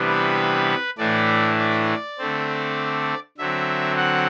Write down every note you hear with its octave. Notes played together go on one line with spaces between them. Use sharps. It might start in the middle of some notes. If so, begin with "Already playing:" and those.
Already playing: C3 E3 G3 B3 D4
B4
A2 E3 A3 D4 D5
D5
D3 A3 C4
D3 F#3 C4 E5
F#5